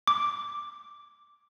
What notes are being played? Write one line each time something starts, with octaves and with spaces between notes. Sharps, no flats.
D6